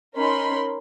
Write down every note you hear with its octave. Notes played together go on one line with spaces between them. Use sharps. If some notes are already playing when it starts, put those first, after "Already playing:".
C#4 D#4 A#4 B5 C6